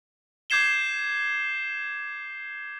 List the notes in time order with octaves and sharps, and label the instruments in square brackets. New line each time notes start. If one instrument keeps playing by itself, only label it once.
[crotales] D6 G6 G#6 C7 E7 G7